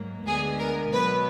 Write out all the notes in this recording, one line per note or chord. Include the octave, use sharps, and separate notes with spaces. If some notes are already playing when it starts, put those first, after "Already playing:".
Already playing: G#2 F#3 A#3
D2 D3 G#3 B3 G#4
A#4
B2 F#3 B3 B4